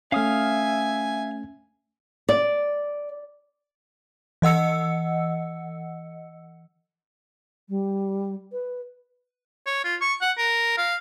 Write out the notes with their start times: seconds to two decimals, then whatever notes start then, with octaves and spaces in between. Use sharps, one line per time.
0.12 A3 C#4 E5 F5 G#5 D#6 F6
2.29 D5
4.42 E3 D#5 F#5 E6 C#7
7.69 G3
8.52 B4
9.67 C#5
9.84 F4
10.01 C#6
10.21 F#5
10.38 A#4
10.78 F5